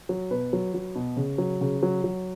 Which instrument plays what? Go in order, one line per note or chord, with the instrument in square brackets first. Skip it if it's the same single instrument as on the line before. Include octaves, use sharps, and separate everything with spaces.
[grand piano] F#3
B2 B4
F#3
F#3
B2
C#3
F#3
C#3
F#3
F#3